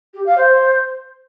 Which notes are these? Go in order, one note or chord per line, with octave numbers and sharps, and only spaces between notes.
G4
F5
C5